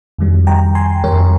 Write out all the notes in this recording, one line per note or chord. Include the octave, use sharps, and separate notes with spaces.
F2 D#3 G3
G5 A#5
G#5 C6
F2 D#3 G3 A#4 C#5